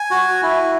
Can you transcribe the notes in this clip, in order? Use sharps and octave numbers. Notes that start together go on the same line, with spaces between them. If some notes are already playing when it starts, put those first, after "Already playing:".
Already playing: G#5
F#4
E4